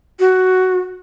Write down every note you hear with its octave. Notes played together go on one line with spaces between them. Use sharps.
F#4